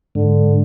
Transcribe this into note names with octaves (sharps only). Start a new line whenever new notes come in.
G#2 D3